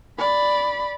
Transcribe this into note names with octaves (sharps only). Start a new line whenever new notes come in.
D5 B5